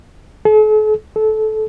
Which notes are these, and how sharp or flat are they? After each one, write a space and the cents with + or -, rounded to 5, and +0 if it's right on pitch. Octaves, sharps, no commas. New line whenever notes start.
A4 -45
A4 -20